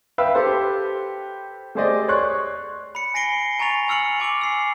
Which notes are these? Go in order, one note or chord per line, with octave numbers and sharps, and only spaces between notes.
B4 E5 F5 G5 B5 E6
G4 A4 B4 C5
A3 G4 G#4 C5 D5 D#5
C#5 D5 C6 C#6 F#6
B5 C#7
G#5 A#6 C7 D7 G7
G#5 A#5 C#6 A6 F7
G#5 E6 F6 C#7 F#7
G#5 D6 D7 F#7
E6 C7